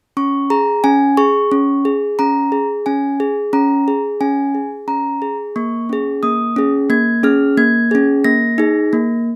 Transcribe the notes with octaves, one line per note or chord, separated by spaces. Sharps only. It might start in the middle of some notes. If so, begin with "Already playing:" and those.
C#4 C#6
G#4 A#5
C#4 G#5
G#4 C#6
C#4
G#4
C#4 A#5
G#4
C#4 G#5
G#4
C#4 A#5
G#4
C#4 G#5
G#4
C#4 A#5
G#4
A#3 C#6
C#4 G#4
A#3 D#6
C#4 G#4
A#3 G#6
C#4 G#4 F6
A#3 G#6
C#4 G#4
A#3 A#6
D#4 G#4
A#3